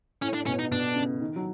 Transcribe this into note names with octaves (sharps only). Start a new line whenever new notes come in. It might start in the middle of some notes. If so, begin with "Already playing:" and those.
A2 C#4
D4
B2 C#4
D#4
B2 D4
C#3
D#3
F#3